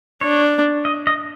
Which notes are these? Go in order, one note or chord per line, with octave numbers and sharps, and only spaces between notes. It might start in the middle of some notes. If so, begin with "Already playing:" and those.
D4 C#5
D#5
D#5